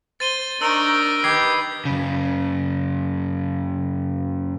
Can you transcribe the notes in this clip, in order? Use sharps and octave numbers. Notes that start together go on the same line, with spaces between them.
C5 A6 D#7 G7
D4 D#4 A#4 A#5 C#6 E6
D#3 G4 B4 D#6 G#6 C7
F#2 C#3